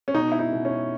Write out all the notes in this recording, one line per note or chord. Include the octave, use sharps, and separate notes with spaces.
C#4
B2 D#4
E4
D#4
B2
C#4